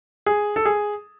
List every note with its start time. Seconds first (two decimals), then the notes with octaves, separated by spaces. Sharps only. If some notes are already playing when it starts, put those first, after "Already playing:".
0.26 G#4
0.56 A4
0.65 G#4